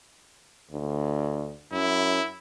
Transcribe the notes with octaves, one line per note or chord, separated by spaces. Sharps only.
D2
F#2 E4